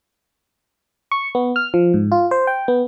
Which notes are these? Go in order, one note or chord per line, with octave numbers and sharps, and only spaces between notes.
C#6
B3
F6
F3
G#2
F4
C5
G5
B3